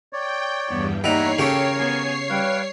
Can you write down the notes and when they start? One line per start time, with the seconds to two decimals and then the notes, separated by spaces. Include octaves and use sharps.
0.13 C#5 D5 G5
0.68 E2 G2 B3
1.04 G3 A#3 D#4 C#5 E5 F#5 A#5 C7
1.39 C#3 G4 A4 A#4 G5 C#6
1.76 B3 G#5
2.29 G3 B4 F5 G5